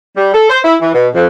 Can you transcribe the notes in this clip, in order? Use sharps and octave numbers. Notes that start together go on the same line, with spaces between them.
G3
A4
C5
E4
E3
B2
F2